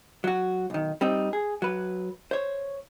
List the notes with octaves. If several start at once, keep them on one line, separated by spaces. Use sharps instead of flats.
F#3 F#4
B1 D#3
G3 C4 D#4
G#4
F#3 B4
C5 C#5